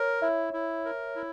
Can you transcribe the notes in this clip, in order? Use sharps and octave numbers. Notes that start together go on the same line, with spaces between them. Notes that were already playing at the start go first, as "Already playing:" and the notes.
Already playing: A#4 C#5
E4 E5
E4
A#4
E4